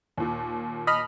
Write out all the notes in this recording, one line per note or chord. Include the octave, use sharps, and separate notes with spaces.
D#2 A#2
D#5 B5 F6